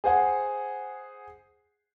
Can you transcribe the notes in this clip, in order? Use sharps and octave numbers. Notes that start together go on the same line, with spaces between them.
G#4 C5 F#5 G#5